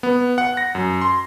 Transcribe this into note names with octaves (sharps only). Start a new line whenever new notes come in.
B3
F#5
A#6
F#2
C6